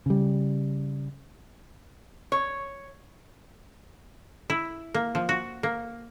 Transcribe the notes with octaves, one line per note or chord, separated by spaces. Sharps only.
C#3 G3
C#5
E4
A#3
F3
F#4
A#3